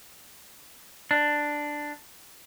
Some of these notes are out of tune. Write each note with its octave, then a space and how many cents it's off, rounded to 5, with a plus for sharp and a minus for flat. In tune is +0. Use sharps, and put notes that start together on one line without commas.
D4 +5